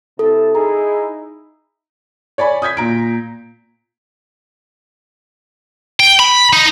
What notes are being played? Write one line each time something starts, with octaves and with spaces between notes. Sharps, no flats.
C3 E4 A4 A5
D#4 E4 G#4 A#5
C#5 D5 G#5 B5
D#6 G6 G#6 B6
A#2 A#5 D7
G5
B5
D#4